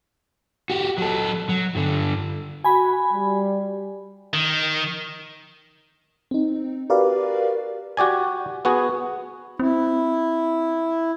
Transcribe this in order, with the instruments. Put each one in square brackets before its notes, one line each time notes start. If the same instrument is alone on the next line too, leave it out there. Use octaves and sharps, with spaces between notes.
[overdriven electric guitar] F#4 G4
F#3 A4
F#3
G2 D3
[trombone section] F#4 [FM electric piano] G#5 B5
[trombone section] G3
[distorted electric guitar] D#3
[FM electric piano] C4 D#4
F#4 G4 A#4 B4 D5 F5
[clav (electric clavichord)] F#4 G4 D5 G#5
B3 F#4 G#4
[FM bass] C4 [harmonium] E4